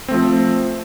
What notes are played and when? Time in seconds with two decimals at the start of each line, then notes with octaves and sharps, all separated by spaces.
0.08 C4
0.11 A3
0.14 F3